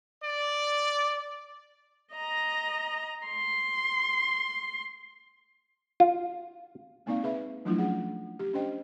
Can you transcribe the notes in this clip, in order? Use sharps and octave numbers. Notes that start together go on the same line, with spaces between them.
D5
D#5 A#5
C6
F4
G#3 A#3 C4 D#4 D5 F5
G#4 B4 E5 B5
F3 F#3 A3 D4 E4 F4
C#4 G#4 F#5
G4
C#4 D4 C5 D#5 G5